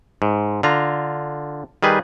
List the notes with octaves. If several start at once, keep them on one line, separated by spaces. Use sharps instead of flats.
G#2
D3 F4 A#5
D#3 G3 G#4 B4